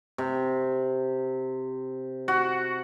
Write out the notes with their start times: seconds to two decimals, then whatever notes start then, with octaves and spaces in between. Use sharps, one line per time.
0.18 C3
2.28 F#4